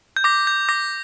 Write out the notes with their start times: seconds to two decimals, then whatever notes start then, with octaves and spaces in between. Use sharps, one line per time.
0.16 G6
0.24 D6 A#6
0.47 G6
0.69 D6 A#6